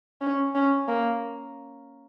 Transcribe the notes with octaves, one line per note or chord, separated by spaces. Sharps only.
C#4
C#4
A#3